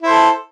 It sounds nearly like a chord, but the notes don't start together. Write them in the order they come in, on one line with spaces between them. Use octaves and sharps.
E4 C5 A4